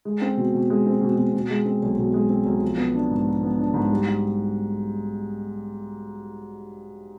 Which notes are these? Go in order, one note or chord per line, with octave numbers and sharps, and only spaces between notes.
G#3
C4
B2
B2
G#3
C4
B2
B2
B2
G#3
C4
B1
B2
G#3
C4
B1
F3
B3
D4
G#2
F3
B3
D4
G#2
G3